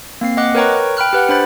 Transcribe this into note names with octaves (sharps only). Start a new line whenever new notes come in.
A#3 C4 C7
D#5 F#5 D6 F#6
A#4 B4 C#5 G5 A#5 C#6
G5 B5 F6 F#6
G4 B4 F#5
D4 C5 B5 A6